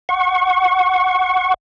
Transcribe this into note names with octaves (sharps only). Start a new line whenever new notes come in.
F#5 C#6